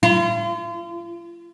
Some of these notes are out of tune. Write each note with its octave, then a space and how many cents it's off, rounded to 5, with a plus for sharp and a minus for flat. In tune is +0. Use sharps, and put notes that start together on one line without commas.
F4 -40